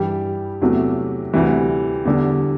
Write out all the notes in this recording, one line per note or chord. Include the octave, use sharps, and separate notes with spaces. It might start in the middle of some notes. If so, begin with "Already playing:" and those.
Already playing: G2 E3 G3 G4
E2 C3 F#3 A3
D2 C3 E3 G3
E2 D3 G3